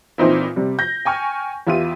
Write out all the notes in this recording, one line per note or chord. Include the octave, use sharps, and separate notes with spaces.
A#2 E3 C4 D#4 E4
C3 G3
G6 A#6
G5 G#5 C#6 F6
E2 E4 F4 G4 D#7